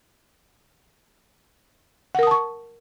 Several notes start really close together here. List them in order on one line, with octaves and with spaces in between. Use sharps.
F#5 A#4 D#6 A5 C#6